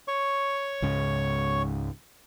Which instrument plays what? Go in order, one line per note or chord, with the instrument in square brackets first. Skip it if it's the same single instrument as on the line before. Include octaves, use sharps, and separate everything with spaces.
[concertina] C#5 C#6
[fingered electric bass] C#2 G#2 C#3